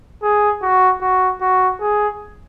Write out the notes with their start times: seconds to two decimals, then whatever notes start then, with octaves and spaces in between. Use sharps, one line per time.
0.22 G#4
0.62 F#4
1.01 F#4
1.41 F#4
1.80 G#4